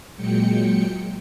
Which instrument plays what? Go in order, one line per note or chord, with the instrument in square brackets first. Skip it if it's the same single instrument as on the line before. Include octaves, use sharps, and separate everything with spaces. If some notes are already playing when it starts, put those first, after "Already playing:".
[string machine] A#2 F#3 G#3 G5 C#7